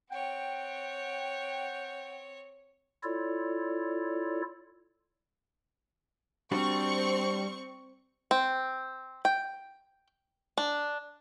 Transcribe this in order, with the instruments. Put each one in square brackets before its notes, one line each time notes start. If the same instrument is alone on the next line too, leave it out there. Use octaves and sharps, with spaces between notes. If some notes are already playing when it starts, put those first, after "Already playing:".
[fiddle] C4 C#5 [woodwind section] F#5 G5
[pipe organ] E4 F4 A4 C#5 D5
[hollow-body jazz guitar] G3 D4 F#4 [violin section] C4 C#6
[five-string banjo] C4
G5
D4